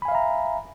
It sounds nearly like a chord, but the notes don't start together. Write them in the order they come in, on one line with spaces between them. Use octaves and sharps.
B5 G#5 F5 E5 A#5